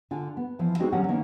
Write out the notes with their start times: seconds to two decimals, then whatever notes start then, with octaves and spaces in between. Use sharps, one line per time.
0.11 D3 F4 G#5
0.37 B3
0.59 E3 F3 E4 F4
0.79 G#3 B3 C4 D#4 F#4 G#4
0.92 D3 F#3 G3 C#4 A#4 F#5
1.08 D#3 A#3 B3 C#4